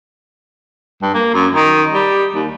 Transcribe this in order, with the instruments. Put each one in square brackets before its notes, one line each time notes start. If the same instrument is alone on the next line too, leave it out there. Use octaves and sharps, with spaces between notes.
[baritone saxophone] G2
A#3
F#2
D#3
G3
D#2